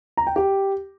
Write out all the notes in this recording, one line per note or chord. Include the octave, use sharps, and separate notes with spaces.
A#5
G5
G4